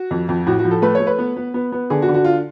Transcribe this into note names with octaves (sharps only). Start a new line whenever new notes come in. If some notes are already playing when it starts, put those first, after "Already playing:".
Already playing: F#4
F2
F2
A2 F#4
F#4
F3
A4
A3 B4
C#5
A3
B4
B3
B3
B3
B3
D3 G#4
F#4
D3
F#4
F4